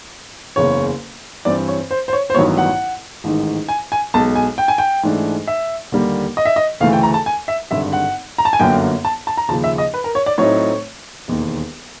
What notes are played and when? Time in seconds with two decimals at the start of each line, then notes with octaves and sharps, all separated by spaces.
0.56 F#1 E2 C#3 C#5
1.45 G2 E3 G3 C4 D5
1.68 C#5
1.91 C5
2.08 C5
2.13 C#5
2.30 C5
2.34 A1 G2 D#3 F#3 B3 C#5
2.58 F#5
3.24 A1 G#2 D#3
3.68 G#5
3.92 G#5
4.14 B1 B2 G#3 A5
4.35 G#5
4.58 G5
4.68 G#5
4.78 G5
5.03 G#2 E3 A3 D4
5.47 E5
5.92 D#2 D3 G3 A#3
6.37 D#5
6.45 E5
6.56 D#5
6.81 D2 C#3 E3 A3 F5
6.93 G5
7.03 A#5
7.14 A5
7.26 G#5
7.48 E5
7.71 G#1 G2 D3 E5
7.93 F#5
8.38 A#5
8.45 A5
8.53 G#5
8.59 G1 F#2 D3 F#3 A#3 G5
9.05 A5
9.27 A5
9.37 A#5
9.48 D#2 C#3 F3 A5
9.64 E5
9.78 D#5
9.94 B4
10.04 A#4
10.15 C#5
10.26 D5
10.38 A2 F#3 A3 C4 D#4 C#5
11.28 E1 D#2 D#3